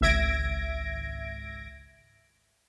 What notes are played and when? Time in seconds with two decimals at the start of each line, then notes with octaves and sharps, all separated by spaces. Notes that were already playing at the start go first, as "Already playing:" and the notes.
0.01 G#1 C#2 E5 G#6 A#6 D7